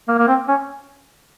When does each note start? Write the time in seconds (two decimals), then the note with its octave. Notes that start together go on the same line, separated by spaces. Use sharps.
0.08 A#3
0.18 A#3
0.28 C4
0.48 C#4